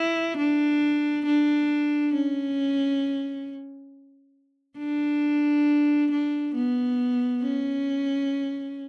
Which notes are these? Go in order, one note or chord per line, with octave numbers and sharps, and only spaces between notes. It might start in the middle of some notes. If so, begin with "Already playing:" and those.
Already playing: E4
D4
D4
C#4
D4
D4
B3
C#4